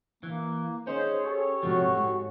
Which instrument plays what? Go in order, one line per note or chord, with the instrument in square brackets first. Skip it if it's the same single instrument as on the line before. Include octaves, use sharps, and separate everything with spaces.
[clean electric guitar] E3 [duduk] A#3
[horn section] D#3 G#3 C5 [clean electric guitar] C#4 [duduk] G#4
[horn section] G4 A4 C#5
[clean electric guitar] G#2 C3 F3 [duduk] F#4
[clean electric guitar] G#2